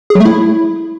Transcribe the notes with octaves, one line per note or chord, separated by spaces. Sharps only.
G#4
F#3
A3
E4